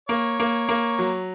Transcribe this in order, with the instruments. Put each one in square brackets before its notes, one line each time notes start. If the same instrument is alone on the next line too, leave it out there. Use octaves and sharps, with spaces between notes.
[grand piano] A#3 [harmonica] C#5
[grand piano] A#3
A#3
F#3